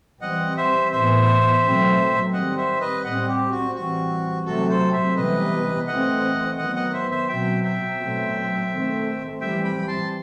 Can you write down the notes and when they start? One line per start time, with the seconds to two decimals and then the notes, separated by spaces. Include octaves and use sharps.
0.21 E3 G3 C4 D#5 F#5
0.57 C5 E5
0.92 A2 E3 B3 C5 E5
1.63 B2 F#3 A3 C4
2.33 D#3 G3 C4 D#5 F#5
2.57 C5 E5
2.80 B4 D#5
3.04 A2 G3 C4 D#5 F#5
3.28 G4
3.51 F#4
3.75 E3 G3 C4 F#4
4.46 C3 F#3 A3 C4 F#4 A4
4.69 A4 C5
4.93 C5 E5
5.16 C3 E3 G3 B3 B4 D#5
5.87 E3 A3 C4 D#5 F#5
6.58 D#3 F#3 B3 D#5 F#5
6.76 D#5 F#5
6.93 C5 E5
7.11 C5 E5
7.28 B2 F#3 C4 E5 G5
7.64 E5 G5
7.99 B2 F#3 A3 C4
8.70 D#3 A3 C4
9.41 E3 G3 C4 E5 G5
9.64 G5 B5
9.88 A5 C6